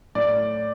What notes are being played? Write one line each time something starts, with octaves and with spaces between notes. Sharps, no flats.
A2 D5